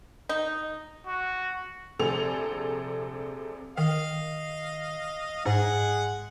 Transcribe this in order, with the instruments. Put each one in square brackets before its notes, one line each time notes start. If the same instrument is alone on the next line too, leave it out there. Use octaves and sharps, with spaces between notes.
[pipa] D#4
[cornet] F#4
[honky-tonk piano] A#1 C3 G#4 A4 F7
[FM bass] D#3 [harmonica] D#5 F5
[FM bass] G#2 [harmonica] G#3 G#4 F#5